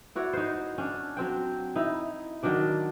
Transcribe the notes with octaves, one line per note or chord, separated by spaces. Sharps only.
E4 F#4 C#5 D5
D#4 C5
C#4 D4
F#3 C4 G5
D#4 E4
D#3 F#3 D4 D5